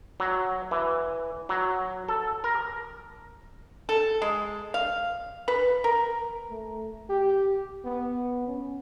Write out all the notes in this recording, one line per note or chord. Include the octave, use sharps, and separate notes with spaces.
F#3
E3
F#3
A4
A#4
A4
G#3
F5
B4
A#4
A3
G4
B3
C#4